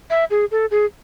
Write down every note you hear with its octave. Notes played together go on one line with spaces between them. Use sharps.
E5
G#4
A4
G#4